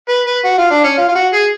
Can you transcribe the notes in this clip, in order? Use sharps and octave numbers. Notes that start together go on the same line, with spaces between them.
B4
B4
F#4
F4
D4
C#4
F4
F4
F#4
G#4